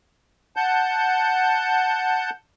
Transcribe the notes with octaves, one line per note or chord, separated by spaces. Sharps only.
F#5 A5 G6